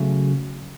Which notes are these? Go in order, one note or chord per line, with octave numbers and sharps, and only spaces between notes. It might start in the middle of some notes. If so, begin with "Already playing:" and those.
Already playing: C#3 F#3 A3